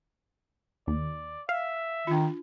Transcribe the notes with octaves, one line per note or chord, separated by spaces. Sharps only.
D#2 D5
E5 F5
D#3 D4 F4